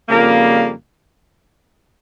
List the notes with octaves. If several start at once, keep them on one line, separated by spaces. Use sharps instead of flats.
F2 C#3 G3 A#3